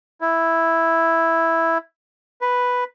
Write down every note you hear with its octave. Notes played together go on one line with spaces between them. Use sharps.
E4
B4